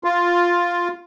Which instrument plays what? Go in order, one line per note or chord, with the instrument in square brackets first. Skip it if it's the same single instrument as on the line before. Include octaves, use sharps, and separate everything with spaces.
[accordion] F4